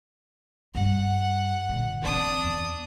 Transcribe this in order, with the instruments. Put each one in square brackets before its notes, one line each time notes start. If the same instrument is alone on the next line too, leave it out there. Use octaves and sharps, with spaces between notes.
[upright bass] G2 G3 [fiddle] F#5
[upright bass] A#2 D3
[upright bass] E3 C4 [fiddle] D4 D#6
[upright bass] E2